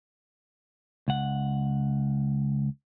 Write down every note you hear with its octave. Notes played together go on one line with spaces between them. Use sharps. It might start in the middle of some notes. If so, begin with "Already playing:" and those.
C#2 F#5